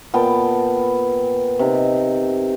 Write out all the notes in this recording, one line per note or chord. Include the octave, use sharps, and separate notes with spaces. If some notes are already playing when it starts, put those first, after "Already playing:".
A#2 B3 G5 A5
C3 D#4